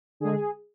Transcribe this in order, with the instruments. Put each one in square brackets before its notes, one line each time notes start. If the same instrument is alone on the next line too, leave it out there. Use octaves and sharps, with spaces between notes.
[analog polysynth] D3 G#3 G#4